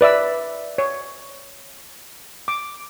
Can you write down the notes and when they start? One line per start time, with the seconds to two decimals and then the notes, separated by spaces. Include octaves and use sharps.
0.01 B4 D5 E5 E6
0.78 C#5
2.48 D6